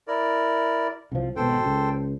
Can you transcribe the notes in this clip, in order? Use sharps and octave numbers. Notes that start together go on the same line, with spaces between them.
E4 A#4 D5
C2 F3
G#1 B2 A4 C5 G5
C#2